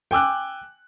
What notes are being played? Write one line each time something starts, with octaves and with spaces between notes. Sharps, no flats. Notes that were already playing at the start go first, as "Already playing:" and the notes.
G5 G#5 D6 E6 F#6